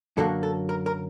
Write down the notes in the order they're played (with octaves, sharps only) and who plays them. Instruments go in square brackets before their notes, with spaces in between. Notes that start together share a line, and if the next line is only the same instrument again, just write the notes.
[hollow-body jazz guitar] F#2 D3 F#3 A#3 A4
A4
A#4
A#4